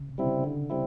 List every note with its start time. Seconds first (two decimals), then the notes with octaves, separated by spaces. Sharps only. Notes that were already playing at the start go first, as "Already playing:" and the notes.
Already playing: C#3
0.09 C3
0.18 G3 C4 E4
0.26 C#3
0.44 D3
0.70 G3 C4 E4